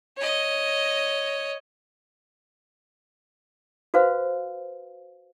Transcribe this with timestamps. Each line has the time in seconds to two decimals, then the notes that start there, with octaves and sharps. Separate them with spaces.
0.17 C#5 D#5
3.94 F#4 B4 C5 F5